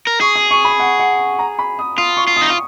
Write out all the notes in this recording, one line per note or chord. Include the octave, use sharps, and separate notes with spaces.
A#4
G#4 C#6
D#6
C#6
B5
F#5
F#5
A#5
B5
D#6
F4 D#6
C#6
F4
D#6
D#4
F4